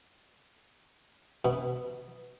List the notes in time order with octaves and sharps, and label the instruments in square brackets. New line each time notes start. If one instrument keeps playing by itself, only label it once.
[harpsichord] B2